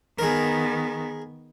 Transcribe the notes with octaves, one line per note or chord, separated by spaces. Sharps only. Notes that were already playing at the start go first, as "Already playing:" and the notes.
D#3 B3 G#4 A#4